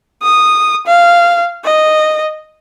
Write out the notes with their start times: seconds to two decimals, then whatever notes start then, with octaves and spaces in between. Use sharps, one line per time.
0.22 D#6
0.87 F5
1.65 D#5